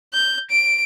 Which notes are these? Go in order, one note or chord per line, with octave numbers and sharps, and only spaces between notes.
G6
D7